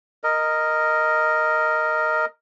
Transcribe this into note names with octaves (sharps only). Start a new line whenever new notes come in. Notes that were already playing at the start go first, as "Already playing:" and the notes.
A#4 D#5